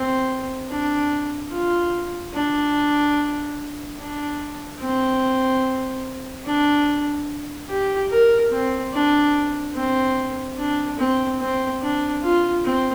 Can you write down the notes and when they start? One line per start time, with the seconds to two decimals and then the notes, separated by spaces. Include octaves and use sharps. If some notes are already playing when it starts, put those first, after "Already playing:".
Already playing: C4
0.69 D4
1.51 F4
2.34 D4
3.98 D4
4.81 C4
6.46 D4
7.69 G4
8.10 A#4
8.51 C4
8.93 D4
9.75 C4
10.58 D4
10.99 C4
11.40 C4
11.81 D4
12.22 F4
12.64 C4